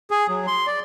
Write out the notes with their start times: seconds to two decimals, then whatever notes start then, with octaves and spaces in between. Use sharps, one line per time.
0.11 G#4
0.29 F#3
0.47 C6
0.67 D5